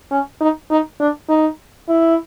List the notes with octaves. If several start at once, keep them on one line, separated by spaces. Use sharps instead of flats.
C#4
D#4
D#4
D4
D#4
E4